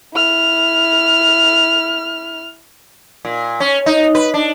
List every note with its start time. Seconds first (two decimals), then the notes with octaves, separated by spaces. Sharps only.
0.14 E4 F6
3.25 A#2
3.60 C#4
3.86 D#4
4.15 B4
4.34 D4